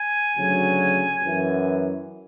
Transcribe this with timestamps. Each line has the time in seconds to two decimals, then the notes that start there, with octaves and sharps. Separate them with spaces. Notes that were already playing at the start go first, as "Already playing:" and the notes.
Already playing: G#5
0.35 D2 C#3 F#3
1.22 F#2 E3